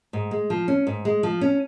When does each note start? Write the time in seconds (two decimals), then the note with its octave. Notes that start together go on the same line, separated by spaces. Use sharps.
0.13 G#2
0.31 G#3
0.50 F3
0.68 C#4
0.87 G#2
1.05 G#3
1.23 F3
1.41 C#4